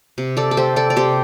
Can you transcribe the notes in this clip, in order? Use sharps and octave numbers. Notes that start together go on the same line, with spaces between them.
C3
A4 D5
A4
A3 G4 C5
A4 D5
D5
C3 G4 C5